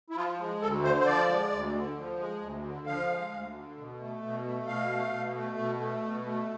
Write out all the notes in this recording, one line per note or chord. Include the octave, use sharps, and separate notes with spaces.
E4
F3 F4
G#3
D2 A4
D3 C5
C5
F3 D5
G#3
D2
D3
F3
G#3
D2
D3
F3 F5
G#3
D2
D3
B2
A3
B2
A3
B2 F5
A3
B2
A3
B2
A3
B2
A3